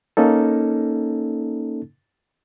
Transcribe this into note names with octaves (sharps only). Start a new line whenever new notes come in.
A#3 C#4 D#4 A4